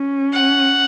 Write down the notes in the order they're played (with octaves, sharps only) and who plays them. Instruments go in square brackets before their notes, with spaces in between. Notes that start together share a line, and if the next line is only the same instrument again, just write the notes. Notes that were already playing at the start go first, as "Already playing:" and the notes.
Already playing: [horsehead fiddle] C#4
[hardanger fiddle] F#5